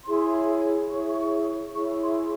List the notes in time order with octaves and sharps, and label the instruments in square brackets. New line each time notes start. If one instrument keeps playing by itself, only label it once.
[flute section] E4 G#4 C#5 C6
E4 G#4 C#5 C#6
C#6
E4 G#4 C#5 C#6
C6